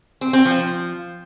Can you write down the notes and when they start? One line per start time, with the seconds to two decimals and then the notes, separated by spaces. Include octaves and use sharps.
0.21 C4
0.33 C4
0.45 F3